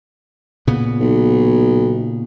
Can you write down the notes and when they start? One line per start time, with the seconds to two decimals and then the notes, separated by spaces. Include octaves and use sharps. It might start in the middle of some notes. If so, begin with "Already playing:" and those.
0.67 A#2 C#3 B3
0.99 B1